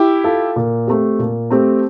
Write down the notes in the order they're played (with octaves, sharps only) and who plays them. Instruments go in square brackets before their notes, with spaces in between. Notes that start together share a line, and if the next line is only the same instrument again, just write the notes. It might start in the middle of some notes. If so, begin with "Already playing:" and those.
Already playing: [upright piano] E4 G4
[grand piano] F4 A4
A#2
A3 C4 G4
A#2
A3 C4 G4